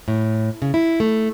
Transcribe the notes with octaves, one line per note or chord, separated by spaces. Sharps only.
A2
C#3
E4
A3